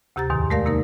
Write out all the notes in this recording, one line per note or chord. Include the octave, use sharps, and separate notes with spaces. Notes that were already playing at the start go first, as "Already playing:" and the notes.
D2 C3 G4 A#5 A6
E2 G#2 B2 D#3
G#3 A3 A#4 D5 F5
C3 A#3 D#4 A#4